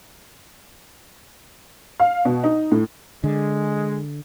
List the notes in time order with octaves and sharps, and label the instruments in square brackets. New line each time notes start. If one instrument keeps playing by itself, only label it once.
[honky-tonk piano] F5
B2
D#4
A2
[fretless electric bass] D3 [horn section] G#3